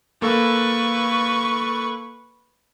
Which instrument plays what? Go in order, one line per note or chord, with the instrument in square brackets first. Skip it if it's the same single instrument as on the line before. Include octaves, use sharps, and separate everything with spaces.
[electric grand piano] A#3 A4 F5 [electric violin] B4 C#6